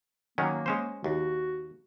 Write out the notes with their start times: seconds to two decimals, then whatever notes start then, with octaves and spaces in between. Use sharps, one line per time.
0.38 D#3 F#3 A#3 C#4
0.66 G#3 C#4 C5
1.04 D#2 F#4